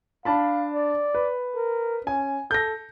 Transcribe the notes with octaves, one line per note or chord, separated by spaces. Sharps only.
D4 F5 A5 B5
D5
B4
A#4
C#4 G#5
A4 G6 A#6